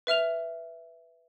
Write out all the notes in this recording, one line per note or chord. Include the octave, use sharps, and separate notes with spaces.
B4 E5 F6 F7